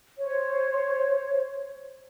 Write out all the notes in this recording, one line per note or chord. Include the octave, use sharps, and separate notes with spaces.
C5 C#5